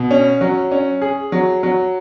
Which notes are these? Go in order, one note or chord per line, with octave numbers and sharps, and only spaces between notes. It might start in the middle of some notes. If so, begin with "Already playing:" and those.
Already playing: B2
C#4
F#3
C#4
G#4
F#3
F#3